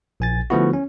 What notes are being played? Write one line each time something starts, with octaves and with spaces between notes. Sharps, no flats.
A#1 G#5 A6
D3 F3 A3 B3 E4 F#4
C#4